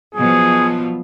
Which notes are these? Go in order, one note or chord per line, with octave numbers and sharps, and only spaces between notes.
B2 F3 F#3 G#4